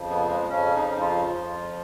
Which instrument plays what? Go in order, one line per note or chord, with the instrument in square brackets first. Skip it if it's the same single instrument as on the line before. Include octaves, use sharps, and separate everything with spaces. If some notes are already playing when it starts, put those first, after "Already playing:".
Already playing: [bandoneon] F2 C#3 F3
B3
G#3
F2 C#3 F3 C#4
D#4
C#4
D#4
F4
F2 F3